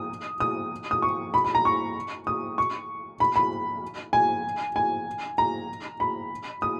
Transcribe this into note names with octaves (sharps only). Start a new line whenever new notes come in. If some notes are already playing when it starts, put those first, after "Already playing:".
Already playing: D#6
D#6
D#6
C#6
B5
B5
A#5
C#6
D#6
C#6
B5
B5
G#5
G#5
A#5
B5
D#6